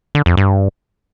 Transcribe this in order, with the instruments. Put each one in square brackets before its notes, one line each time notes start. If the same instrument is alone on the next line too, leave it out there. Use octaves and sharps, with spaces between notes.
[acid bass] D3
F2
G2